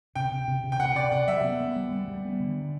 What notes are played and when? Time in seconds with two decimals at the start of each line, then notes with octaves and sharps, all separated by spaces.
0.15 C3 G5
0.31 C3
0.48 C3
0.64 C3
0.72 G5
0.79 C3 F#5
0.95 C3 D5
1.12 C3 F#5
1.28 F#3 E5
1.44 B3
1.61 B3
1.76 G3
1.92 G3
2.08 G3
2.25 B3
2.40 D3